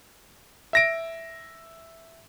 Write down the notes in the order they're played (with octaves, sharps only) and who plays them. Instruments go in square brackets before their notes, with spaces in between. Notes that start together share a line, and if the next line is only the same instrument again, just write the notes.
[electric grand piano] E5 A#6 D7